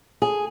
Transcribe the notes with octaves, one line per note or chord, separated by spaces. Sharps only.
G#4